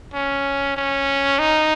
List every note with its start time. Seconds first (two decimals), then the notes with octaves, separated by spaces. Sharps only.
0.14 C#4
0.77 C#4
1.39 D#4